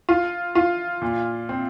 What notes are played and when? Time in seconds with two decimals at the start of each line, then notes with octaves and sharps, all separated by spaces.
0.09 F4
0.55 F4
1.02 A#2
1.49 C4